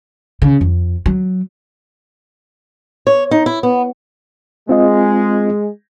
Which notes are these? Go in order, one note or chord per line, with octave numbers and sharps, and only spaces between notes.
C#3
F2
F#3
C#5
D#4
E4
B3
G#3 C4 F4 D#5